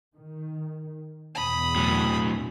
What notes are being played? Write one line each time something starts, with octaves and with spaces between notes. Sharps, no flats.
D#3
E2 B2 B5 D#6
A2 F#3